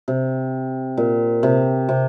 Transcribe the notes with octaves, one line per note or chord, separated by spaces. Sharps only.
C3
A#2
C3
C3